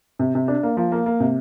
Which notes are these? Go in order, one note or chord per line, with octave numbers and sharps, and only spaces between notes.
C3
C3
D4
A#3
F3
A#3
A#3
C3